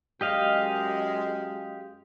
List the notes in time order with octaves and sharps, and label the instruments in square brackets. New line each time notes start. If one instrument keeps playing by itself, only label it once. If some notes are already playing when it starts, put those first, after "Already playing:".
[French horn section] F#2 G#3 [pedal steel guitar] G4 D#5 F5